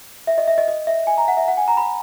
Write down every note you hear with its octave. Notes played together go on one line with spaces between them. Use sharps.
E5
D#5
E5
D#5
D#5
E5
G#5
A#5
F#5
E5
F#5
G#5
A#5
B5